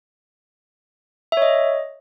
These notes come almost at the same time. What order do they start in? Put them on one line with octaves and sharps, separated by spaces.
E5 C#5 D#5